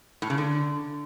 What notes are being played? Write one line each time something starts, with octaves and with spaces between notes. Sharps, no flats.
A2
C#3
D3